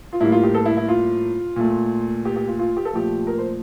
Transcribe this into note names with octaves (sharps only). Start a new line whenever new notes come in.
F4
A2 G3 A#3 E4
F4
G4
A4
E4
E4
F4
A#2 A3
G4
G4
F4
F4
G4
A4
A#2 F3 A3 G4
A#4
C5